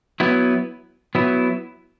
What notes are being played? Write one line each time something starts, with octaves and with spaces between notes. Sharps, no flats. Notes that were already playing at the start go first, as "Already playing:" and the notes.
F#3 B3 E4
F#3 B3 E4